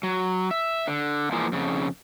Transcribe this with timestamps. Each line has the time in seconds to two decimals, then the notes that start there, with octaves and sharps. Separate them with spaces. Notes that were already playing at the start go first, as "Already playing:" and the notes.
0.03 F#3
0.51 E5
0.87 D3
1.32 E3 F3 G#3 A#3
1.52 F2 C#3